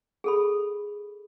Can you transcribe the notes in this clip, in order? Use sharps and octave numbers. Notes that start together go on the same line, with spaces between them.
G#4 A4 B5